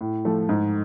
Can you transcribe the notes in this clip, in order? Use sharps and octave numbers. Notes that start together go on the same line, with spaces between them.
A2
F3 A3
G#2